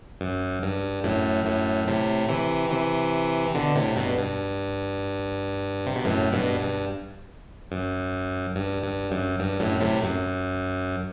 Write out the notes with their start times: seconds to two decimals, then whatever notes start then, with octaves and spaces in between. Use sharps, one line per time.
0.21 F#2
0.62 G2
1.04 F#2 A2
1.46 F#2 A2
1.88 A2 C3
2.29 C3 E3
2.71 C3 E3
3.55 B2 D3
3.76 A2 C3
3.96 G2 B2
4.17 G2
5.86 C3
5.96 B2
6.05 F#2 A2
6.32 G2 B2
6.60 G2
7.72 F#2
8.56 G2
8.83 G2
9.11 F#2
9.39 G2
9.60 F#2 A2
9.81 A2 C3
10.02 F#2